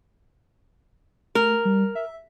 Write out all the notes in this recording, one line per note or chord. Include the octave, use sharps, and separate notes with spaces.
A3 A#4
G3
E5